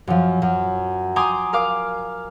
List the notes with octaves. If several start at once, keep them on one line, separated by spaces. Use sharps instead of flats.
F#2 F3
F#2
G5 G#5 A#5 C6 D6 D#6
A#4 F5 D6 F6